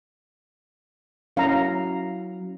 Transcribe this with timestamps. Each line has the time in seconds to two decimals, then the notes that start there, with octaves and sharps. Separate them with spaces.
1.37 F#3 C#4 E4 F5 A#5